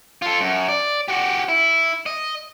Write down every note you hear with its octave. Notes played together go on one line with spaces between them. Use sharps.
F4 A4
F#2
D5
F#4 G4
E4
D#5